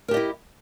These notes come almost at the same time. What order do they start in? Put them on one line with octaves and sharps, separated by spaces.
A#4 G4 D#5 E4